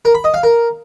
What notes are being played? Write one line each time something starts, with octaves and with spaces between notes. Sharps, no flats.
A#4
B5
D#5
F5
A#4